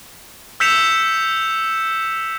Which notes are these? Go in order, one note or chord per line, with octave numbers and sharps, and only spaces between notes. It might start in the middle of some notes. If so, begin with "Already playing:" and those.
E6 G6 B6 C#7 E7 F7